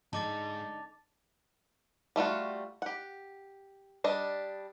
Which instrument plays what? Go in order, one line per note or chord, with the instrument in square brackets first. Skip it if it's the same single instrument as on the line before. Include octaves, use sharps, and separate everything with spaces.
[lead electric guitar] G#2 G#3 [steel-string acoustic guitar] D3 D#4 [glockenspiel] A5 D6 A6
[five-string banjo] G3 A3 F4 F#4
G4 F#5
G3 D4 D#5